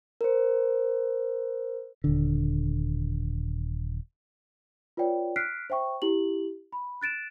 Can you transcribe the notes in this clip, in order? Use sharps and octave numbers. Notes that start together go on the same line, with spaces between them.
A#4 C5
D#1 D3
F4 B4 C#5 D5 G5
F6 F#6 B6 C7 D7
C5 E5 G5 C#6
E4 G4 F#7
B5
F#6 A6 D7 E7